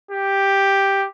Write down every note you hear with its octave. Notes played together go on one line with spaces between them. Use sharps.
G4